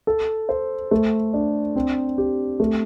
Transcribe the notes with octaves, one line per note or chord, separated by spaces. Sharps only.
A4
C5
A3
D4
C4
G4
A3